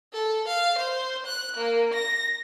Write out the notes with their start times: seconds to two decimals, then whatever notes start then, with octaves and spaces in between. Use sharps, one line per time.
0.13 A4
0.47 F5
0.78 C5
1.26 F#6
1.56 A#3
1.93 A#6